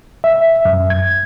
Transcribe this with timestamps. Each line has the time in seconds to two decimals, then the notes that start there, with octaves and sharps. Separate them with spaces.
0.24 E5
0.65 F#2
0.90 G#6